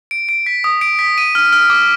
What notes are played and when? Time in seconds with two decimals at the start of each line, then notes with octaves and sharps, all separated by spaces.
0.11 D7
0.29 D7
0.46 B6
0.64 D#6
0.81 D7
0.99 B6
1.18 D#7
1.35 F6
1.53 F6
1.70 D6